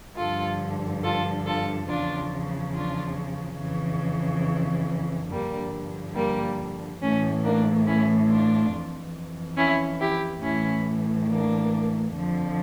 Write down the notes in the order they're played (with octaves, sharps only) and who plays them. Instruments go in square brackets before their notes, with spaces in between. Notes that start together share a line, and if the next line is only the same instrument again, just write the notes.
[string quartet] G2 D3 F3 F4 A4
F4 A4
F4 A4
E2 C#3 F3 D4 F4
D4 F4
F2 C#3 E3
G2 D3 F3 G3 A#3
G3 A#3
A2 E3 A3 C#4
A#3 D4
C#4 E4
D4 F4
F2 E3
C#4 E4
E4 G4
A2 E3 C#4 E4
A#3 D4
F2 D3 F3